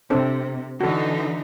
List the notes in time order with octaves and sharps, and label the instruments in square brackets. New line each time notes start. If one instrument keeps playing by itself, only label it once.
[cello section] C3 [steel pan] C4 D4 A4
[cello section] D3 E3 D#4 [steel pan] F#4 A4